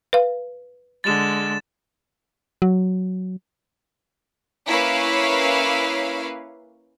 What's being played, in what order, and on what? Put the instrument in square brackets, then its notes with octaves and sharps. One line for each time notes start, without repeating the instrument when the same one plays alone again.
[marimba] B4 F5
[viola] D3 G#3 [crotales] A6 E7
[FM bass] F#3
[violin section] A#3 C#4 E4 B4 C#5 F5